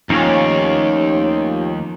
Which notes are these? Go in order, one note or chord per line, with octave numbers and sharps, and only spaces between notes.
D#2 F3 A3 C#4 D#4 F4 G4 C#5